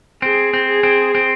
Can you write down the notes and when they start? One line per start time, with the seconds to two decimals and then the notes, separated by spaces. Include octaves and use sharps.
0.22 C4 G#4
0.54 C4
0.69 G#4
0.83 C4
1.15 C4